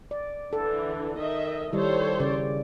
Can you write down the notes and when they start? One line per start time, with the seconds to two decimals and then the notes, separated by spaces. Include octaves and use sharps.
0.11 D5
0.53 D3 E3 A4
1.18 D#3 D#5 E5
1.73 D#3 G3 E4 A4 C5 C#5
2.20 C#3 D5